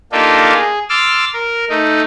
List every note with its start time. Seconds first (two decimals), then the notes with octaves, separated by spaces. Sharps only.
0.12 A#3 D4 D#4 F4 G4 A4
0.54 G#4
0.89 C6 D6 E6 F6 A6
1.33 A#4
1.69 A3 D#4